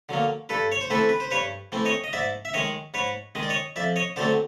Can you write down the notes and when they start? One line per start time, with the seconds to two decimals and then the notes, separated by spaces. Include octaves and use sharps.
0.09 D3 F#3 A#3
0.49 G2 A4 B4
0.72 C#5
0.81 C5
0.90 E3 A3 C4 A4 B4
1.09 B4
1.20 C5
1.31 G2 B4 C#5
1.72 E3 A3 C4
1.85 C#5 D#5
2.04 D#5
2.13 G#2 D5 E5
2.45 E5
2.54 D#3 G#3 C#5 D#5
2.94 G#2 B4 C#5
3.35 D#3 G#3 D#5
3.43 D5
3.49 C#5 D#5
3.76 F2 D5 E5
3.96 C#5 D#5
4.16 D3 F#3 A3 C4 C5 D5